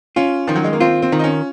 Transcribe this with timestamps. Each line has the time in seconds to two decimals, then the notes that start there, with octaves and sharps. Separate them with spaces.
0.16 C#4 F4
0.47 D#3 F3
0.56 F#3
0.64 G#3
0.73 A#3
0.80 C4 F4
1.02 C4
1.12 D#3
1.19 D#4
1.24 C#4